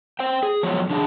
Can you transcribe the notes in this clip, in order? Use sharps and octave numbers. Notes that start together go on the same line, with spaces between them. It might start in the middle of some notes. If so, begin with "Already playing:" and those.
C5 G5
G#4
F3 F#3 B3 C5 C#5
D3 D4 G#4 A5